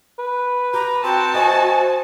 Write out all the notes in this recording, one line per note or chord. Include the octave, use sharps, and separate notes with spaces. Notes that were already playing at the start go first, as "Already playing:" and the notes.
B4
G4 A#5
C4 F#4 G5 A5
E4 C5 D#5 G#5